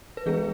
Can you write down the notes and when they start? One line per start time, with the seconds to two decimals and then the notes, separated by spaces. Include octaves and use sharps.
0.17 B4
0.26 E3 G#3 B3 G#4